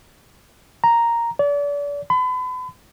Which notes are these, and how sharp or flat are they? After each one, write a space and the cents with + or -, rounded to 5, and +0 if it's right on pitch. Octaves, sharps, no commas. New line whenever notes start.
A#5 +0
D5 -35
B5 +35